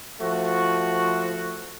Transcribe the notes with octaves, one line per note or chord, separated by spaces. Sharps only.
F3 A3 F#4